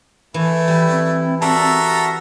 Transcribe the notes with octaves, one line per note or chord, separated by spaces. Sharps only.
E3 A3 E4
E3 G3
C4
F#4 A4 A#4 D5 E5 A#5